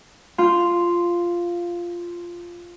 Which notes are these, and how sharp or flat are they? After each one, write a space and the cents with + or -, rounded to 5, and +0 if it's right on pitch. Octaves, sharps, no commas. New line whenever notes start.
F4 -5